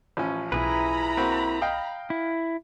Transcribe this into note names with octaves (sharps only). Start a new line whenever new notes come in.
A1 F3 C#4
B1 E4 G#4 B4 A#5 B5
A#3 C4 F#4
D#5 F5 G5
E4